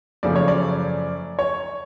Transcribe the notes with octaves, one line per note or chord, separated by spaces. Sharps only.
F#2 C#3 F3 A3 D5
C#5
D5
C#5